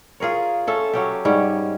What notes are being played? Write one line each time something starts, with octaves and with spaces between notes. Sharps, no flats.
F4 G#4 A#4 C#5
C#4 A4 E5
F#3 C#4 G4
G#2 G3 C#4